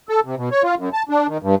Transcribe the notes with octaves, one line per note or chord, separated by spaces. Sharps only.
A4
C3
B2
C#5
F4
F#2
A5
D4
D#3
G2